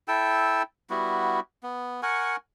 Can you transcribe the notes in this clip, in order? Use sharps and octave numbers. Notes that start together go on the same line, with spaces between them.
E4 A4 G5 E6
G3 B3 E4 F#4
B3
A#4 F#5 G#5 C#6